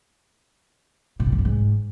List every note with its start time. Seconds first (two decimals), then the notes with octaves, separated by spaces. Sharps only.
1.20 A#2
1.26 G#2
1.32 E3
1.39 G2
1.45 G#2